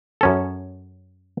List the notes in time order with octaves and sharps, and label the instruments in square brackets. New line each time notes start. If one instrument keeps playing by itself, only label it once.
[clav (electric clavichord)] F#2 C#4 A4